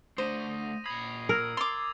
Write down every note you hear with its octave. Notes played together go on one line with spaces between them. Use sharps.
A3 D4 C5 D#6 A#6 D#7
A#2 B5 D#6 G#6 C7
A#4 E6 G#6
C6 D6 A6 F7